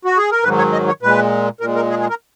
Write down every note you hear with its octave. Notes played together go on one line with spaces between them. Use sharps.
F#4
G#4
A#4
G#2 D#3 F#3 B4
C#5
D#5
C#5
A#2 G#3 B4
A#2 G#3 A#4
A#4
G#4
G#4
A#4